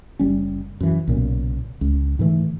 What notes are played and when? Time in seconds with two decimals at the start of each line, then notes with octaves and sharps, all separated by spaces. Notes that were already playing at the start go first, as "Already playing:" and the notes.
0.19 F#1 G3 C#4
0.80 F#2 E3
1.07 B1 A#2 C#3
1.81 C#2
2.19 G#2 D3 E3 A3